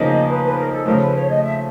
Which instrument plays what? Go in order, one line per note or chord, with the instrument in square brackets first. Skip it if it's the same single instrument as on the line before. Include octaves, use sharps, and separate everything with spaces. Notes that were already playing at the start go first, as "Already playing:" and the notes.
Already playing: [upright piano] C#3 F3 A#3 D#4 G#4 [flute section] D#5
[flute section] B4
B4
A#4
A4
[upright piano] C#3 F3 A3 [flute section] A#4
[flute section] B4
C#5
D#5
E5